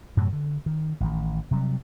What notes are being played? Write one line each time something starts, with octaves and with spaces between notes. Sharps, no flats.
F#2 A2 C3 F#3
D3
D#3
A1 D#3
C3 F#3 G3